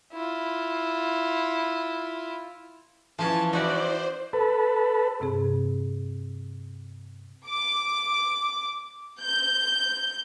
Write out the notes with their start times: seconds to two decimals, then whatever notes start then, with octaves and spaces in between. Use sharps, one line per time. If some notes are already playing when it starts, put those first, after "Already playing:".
0.14 E4 F4
3.19 E3 F3 C#4 G#5 A5
3.53 D#4 F#4 C5 D5 E5
4.33 A4 B4
5.20 G2 C3 C4 G#4
7.48 D6
9.21 G6